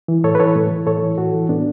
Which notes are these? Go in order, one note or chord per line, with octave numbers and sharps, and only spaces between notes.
E3
A2 A4 C#5
B4
E3 A4 C#5
A2
E3
A2 A4 C#5
E3
A2 F#4 A4
E3
A2 B3 D4